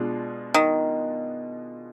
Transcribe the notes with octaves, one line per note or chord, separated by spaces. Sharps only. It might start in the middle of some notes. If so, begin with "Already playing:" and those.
Already playing: B2 G#3 D4 F4
D#3